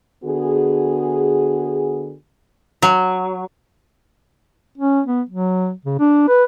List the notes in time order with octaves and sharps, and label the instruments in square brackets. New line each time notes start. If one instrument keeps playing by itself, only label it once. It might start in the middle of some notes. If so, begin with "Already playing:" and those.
[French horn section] D3 B3 F#4 G#4
[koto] F#3
[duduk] C#4
B3
F#3
C#3
D4
B4